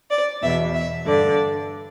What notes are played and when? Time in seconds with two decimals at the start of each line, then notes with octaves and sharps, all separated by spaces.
0.11 D5
0.42 E2 B2 E5
0.74 E5
1.06 G2 D3 D5